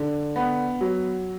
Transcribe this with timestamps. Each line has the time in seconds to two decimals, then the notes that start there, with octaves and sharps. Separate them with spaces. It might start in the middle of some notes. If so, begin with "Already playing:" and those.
Already playing: D3
0.36 B3
0.81 F#3